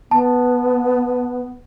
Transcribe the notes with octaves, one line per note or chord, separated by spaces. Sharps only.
B3 A5